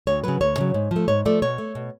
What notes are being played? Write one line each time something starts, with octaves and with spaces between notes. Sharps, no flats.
D2 C#5
C#3 F#3 B4
D2 C#5
C#3 F#3
G#2
F3 A3
G#2 C#5
F3 A3 D5
B2 C#5
A3
B2